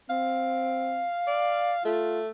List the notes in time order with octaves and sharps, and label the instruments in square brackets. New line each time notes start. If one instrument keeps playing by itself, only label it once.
[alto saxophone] C4 [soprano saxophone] F5
[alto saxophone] D5
[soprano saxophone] A3 [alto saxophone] F4